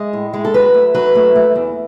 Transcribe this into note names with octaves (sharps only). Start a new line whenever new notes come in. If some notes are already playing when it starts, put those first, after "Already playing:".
Already playing: G#3 D#5
A2
G#3
A4
F#3 B4
A3
F#3 B4
A3
A3
E2